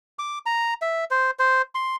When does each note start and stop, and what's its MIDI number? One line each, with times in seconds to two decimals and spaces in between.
0.19 0.39 86
0.46 0.74 82
0.82 1.05 76
1.11 1.31 72
1.39 1.62 72
1.75 1.96 84